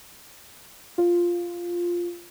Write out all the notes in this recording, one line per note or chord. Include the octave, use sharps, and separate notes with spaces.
F4